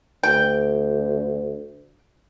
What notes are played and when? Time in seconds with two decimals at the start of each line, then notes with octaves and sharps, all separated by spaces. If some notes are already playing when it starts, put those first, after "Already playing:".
0.23 D2 G5